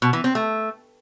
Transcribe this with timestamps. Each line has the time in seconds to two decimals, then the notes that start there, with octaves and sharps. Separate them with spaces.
0.02 B2
0.13 E3
0.24 C4
0.35 A3